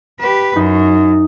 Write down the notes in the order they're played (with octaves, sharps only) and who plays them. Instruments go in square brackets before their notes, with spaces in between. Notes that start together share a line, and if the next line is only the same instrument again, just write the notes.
[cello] G4 B4 [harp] E7
[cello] F#2 [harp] D#4